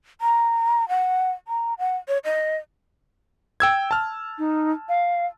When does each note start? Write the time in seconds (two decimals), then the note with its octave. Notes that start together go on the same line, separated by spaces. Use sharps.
0.21 A#5
0.89 F#5
1.48 A#5
1.79 F#5
2.08 C#5
2.24 D#5
3.60 G5 E6 G#6
3.91 A5 F6
4.38 D#4
4.89 F5